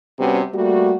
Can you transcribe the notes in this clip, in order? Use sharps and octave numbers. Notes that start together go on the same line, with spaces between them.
C3 G3 B3 C#4 F#4
G3 A3 A#3 F#4